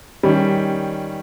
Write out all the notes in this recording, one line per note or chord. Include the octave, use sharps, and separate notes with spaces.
D#3 G3 C#4